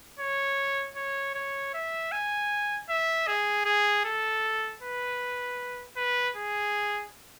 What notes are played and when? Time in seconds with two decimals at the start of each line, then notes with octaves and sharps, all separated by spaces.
0.19 C#5
0.96 C#5
1.35 C#5
1.74 E5
2.12 G#5
2.89 E5
3.27 G#4
3.65 G#4
4.05 A4
4.82 B4
5.96 B4
6.36 G#4